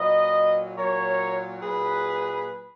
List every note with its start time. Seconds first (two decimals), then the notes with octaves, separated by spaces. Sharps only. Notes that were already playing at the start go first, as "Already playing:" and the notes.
Already playing: A#2 F#3 B4 D#5
0.78 A#2 F#3 A#4 C#5
1.62 A#2 F#3 G#4 B4